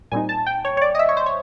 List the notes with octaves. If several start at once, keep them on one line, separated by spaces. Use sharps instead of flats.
A#2 G3 C4 D#4 G#5
A5
G5
C#5
C#5
D5
D#5
E5
C#5
C5
C#5